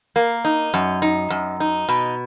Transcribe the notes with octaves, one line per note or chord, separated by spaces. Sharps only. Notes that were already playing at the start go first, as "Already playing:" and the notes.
A#3
D#4
F#2
D#4
F#2
D#4
B2